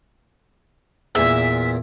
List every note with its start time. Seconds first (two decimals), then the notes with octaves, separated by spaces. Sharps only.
1.15 E2 A#2 E5